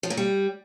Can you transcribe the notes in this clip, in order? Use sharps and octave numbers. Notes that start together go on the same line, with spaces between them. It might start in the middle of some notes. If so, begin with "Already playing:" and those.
F3
A#2
G3